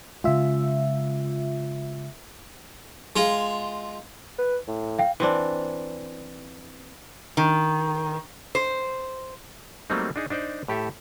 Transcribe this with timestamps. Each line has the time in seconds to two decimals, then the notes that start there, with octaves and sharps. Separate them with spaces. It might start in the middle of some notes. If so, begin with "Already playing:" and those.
0.24 C#3 G#3 F4 E5
3.16 G#3 F4
4.38 B4
4.67 A2
4.99 F5 G5
5.20 E3 C4 D4
7.37 D#3
8.55 C5
9.90 F#3 G3 A3 A#3 C4 D#4
10.16 D4 D#4 G#4
10.30 D4 D#4 C5 D5
10.68 A2 G4 A4 E5